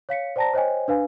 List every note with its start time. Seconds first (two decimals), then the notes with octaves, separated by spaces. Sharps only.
0.09 C#5 F5 B6 C#7
0.36 C5 D5 G5 A5 A#5 A#6
0.54 C5 C#5 D#5 G5 G#5
0.88 D4 B4 F5 G#5